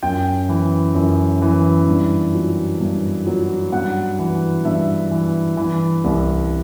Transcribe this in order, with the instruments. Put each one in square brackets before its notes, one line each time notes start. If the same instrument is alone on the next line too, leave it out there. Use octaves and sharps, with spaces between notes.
[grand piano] F#2 G5
E3
F#2
E3
G2
F#3
G2
F#3
G2 F#5
E3
G2 E5
E3
E3
C2